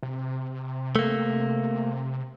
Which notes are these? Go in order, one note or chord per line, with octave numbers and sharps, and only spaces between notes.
C3
A3 A#3